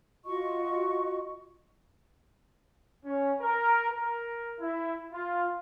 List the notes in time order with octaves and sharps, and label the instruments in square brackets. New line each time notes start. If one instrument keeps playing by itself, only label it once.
[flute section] F4 F#4 D#5 C#6
[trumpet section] C#4
A#4
A#4
E4
F4